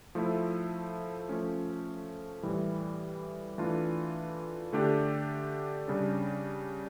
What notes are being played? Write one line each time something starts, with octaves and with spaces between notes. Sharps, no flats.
F3 A3 E4
F3 A3 C#4
A2 E3 G3
E3 A3 D4 F4
D3 A3 D4 G4
C#3 G3 D4